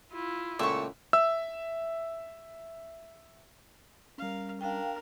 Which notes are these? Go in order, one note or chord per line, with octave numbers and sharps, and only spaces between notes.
E4 F4
C#2 A#2 A3 E5 C#6
E5 E6
G3 C#4 A#4 F5
D4 A#4 F5 G5